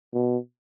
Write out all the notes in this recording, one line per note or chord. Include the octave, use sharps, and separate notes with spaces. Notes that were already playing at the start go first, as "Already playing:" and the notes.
B2